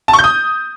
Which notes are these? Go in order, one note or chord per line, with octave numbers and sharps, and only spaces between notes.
A5
C#6
G6
D#6